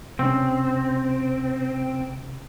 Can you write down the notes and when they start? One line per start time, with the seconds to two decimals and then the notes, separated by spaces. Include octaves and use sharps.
0.19 C3 C4 C#4